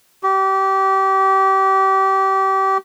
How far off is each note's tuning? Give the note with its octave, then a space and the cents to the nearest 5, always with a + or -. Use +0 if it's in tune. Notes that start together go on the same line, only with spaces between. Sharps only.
G4 -25